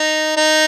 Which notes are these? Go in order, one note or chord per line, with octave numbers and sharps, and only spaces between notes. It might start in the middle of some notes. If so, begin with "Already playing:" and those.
Already playing: D#4
D#4